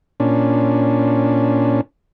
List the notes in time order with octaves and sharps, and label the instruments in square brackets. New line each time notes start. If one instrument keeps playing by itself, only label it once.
[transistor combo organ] A#2 C#4 D4